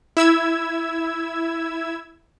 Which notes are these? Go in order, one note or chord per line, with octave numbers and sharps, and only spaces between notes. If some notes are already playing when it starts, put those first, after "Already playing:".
E4 E6 G#6